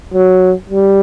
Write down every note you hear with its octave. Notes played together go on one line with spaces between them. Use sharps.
F#3
G3